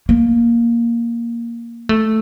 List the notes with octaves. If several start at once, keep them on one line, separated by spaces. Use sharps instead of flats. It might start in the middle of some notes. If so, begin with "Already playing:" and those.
A#3
A3